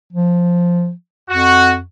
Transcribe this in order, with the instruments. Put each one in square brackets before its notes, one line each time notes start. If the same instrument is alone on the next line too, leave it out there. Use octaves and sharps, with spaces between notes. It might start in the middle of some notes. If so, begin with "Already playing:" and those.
[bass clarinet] F3
[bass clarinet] F2 [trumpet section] F#4